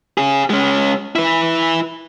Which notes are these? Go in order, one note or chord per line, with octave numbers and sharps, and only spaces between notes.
C#4 G#4
G#3 C#4
E4 B4